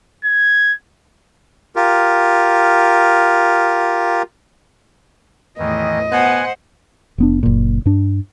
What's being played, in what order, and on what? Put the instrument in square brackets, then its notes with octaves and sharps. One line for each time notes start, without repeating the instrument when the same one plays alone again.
[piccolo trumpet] G#6
[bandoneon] F4 G4 A#4
[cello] E2 A2 [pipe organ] D#3 E3 [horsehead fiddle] D#5
[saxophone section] B2 B3 [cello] C5 F#5 [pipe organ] G#5 F#6
[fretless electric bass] F1 B3 D4
F#1 A#2
G2 D4